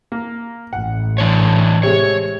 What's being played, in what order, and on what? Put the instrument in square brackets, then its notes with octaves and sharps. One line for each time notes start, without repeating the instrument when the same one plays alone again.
[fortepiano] A#3
[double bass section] A1 [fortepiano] F#5
[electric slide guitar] E3 D4 C#5
[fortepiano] C3 G#3 [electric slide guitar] C#5